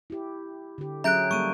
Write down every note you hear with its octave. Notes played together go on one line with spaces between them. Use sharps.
E4 G4
D3 G4
F#3 C#4 G#4 E5 A#5 F#6 G6 D7
G3 A#3 A4 C#6 D#7